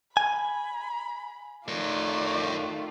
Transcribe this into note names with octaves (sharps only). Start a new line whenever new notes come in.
G#5 B5
D#3 A3 F4 A#4 C#5 D5